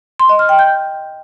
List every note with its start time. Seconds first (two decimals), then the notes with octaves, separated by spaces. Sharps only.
0.20 C6
0.29 D#5
0.39 F6
0.49 G5
0.59 G6